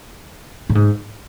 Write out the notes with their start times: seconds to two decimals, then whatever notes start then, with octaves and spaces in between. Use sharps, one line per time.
0.70 A2
0.75 G#2